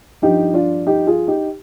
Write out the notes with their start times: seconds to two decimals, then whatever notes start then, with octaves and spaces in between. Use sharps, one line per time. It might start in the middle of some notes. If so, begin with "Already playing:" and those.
0.22 G2 F3 D#4 G4
0.54 D4 F4
0.87 D#4 G4
1.07 F4 G#4
1.28 D#4 G4